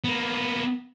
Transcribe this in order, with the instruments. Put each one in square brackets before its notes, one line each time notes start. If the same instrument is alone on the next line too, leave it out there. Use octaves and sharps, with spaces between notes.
[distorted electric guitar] A#3 B3